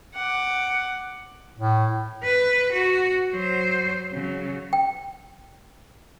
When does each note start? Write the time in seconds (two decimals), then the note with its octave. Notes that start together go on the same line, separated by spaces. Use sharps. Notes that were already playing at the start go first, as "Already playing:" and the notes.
0.14 F#5 D6
1.58 A2
2.24 B4
2.73 F#4
3.31 F#3 C5
4.12 C#3 F#3
4.73 G5